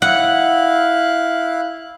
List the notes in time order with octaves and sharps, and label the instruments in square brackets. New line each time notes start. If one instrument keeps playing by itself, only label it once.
[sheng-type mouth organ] E4 F5 F#6 [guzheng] F#5